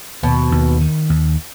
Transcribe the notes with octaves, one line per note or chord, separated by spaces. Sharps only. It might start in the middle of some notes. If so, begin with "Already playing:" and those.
D#2 B2
D#2
D#3
D#2